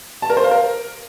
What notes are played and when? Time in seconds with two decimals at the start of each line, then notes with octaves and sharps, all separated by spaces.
0.22 A5
0.30 A#4
0.37 C5
0.44 F5
0.51 A#4